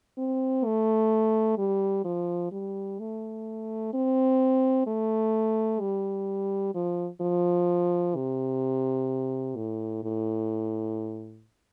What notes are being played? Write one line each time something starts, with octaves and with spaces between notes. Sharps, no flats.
C4
A3
G3
F3
G3
A3
C4
A3
G3
F3
F3
C3
A2
A2